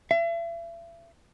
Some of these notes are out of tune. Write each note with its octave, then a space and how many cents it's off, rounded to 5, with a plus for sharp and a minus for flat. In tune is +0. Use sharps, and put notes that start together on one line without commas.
E5 +40